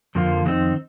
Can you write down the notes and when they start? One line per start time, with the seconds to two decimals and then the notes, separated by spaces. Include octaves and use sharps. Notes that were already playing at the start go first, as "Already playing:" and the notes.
0.15 F2 D3 F3 A#3 F4
0.45 F2 D#3 G#3 C4 D#4